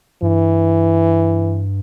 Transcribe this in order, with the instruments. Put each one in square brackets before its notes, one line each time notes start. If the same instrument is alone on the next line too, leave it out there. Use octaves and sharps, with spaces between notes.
[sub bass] G2 [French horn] E3